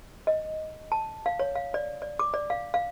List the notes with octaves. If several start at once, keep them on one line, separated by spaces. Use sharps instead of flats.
D#5
A5
F5
C#5
F5
D5
D5
D6
D5
F5
F5